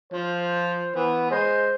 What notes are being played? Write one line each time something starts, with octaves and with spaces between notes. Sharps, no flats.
F3 C5
E3 B3
G#3 C5